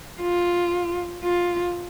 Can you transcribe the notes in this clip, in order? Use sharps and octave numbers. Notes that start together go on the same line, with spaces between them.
F4
F4